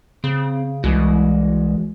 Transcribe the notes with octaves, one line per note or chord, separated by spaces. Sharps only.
C#3 C4
C2 E3 G#3 F#4